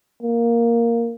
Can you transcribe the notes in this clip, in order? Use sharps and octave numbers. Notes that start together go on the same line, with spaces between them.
A#3